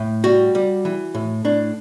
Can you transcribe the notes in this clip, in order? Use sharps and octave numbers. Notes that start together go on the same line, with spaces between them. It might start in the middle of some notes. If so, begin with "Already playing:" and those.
Already playing: A2
G3 F#4
G3
E3
A2
A2 D4